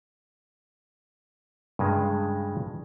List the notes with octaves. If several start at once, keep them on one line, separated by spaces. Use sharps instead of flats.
G2 C#3 G#3